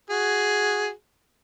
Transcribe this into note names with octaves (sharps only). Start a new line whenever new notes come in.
F#4 G#4